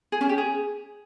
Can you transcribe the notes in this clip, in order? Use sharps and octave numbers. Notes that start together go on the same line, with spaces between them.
G#4
C#4
G4
G#4